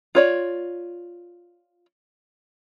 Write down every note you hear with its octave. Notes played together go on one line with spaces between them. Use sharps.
F4 C#5 D5